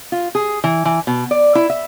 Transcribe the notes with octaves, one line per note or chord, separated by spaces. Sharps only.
F4
G#4
E3
E3
B2
D5
E4
E5